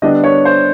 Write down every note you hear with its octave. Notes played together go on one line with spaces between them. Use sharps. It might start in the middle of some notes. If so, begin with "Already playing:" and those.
D3 G3 B3 D4 D#5
C#5
C5